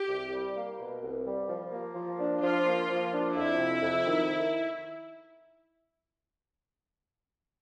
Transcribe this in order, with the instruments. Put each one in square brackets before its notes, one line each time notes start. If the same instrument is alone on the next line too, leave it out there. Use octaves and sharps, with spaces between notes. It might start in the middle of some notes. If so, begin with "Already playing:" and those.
Already playing: [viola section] G4
[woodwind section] C2
G3
A#3
B2
C2
G3
F3
A#3
F3
D4
[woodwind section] F3 [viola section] F4
[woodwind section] A#3
F3
D4
[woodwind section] F2 [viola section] E4
[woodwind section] C3
F2
D#3